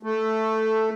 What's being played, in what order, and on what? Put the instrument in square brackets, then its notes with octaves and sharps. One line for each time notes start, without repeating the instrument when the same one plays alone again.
[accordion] A3